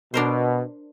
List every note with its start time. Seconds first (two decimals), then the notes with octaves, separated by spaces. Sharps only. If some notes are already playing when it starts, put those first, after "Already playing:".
0.14 B2 D4 A#4 C5